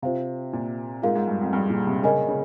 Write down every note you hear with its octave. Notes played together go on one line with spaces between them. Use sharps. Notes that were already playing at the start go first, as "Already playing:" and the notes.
C3 F4 C5 F5
A#2
G#2 F4 A#4 F5
G#2
G2
F2
G2
A#2
C3
C#3 A#4 D#5 G#5
C#3